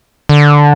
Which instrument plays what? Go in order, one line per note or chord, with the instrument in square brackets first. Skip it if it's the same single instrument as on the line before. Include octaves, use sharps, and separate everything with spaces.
[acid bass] D3